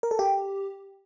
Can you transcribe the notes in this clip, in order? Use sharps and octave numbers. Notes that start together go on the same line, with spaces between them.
A#4
A4
G4